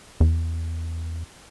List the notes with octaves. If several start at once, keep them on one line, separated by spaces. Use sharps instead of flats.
E2